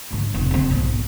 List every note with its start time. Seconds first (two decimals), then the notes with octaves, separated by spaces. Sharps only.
0.11 G#2 D3
0.34 F1
0.51 D3 C4
0.71 B1 G#2